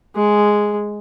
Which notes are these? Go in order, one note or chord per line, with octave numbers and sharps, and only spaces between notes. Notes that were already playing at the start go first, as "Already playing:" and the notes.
G#3